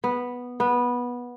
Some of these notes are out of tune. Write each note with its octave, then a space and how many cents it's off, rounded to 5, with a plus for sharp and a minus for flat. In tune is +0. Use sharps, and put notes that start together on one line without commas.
B3 -5
B3 -15